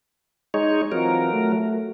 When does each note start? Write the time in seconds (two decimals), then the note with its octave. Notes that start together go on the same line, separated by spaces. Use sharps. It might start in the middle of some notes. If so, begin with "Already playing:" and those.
0.54 G#3 D#4 C#5
0.92 E3 F#3 C4 F4 A#4
1.33 A3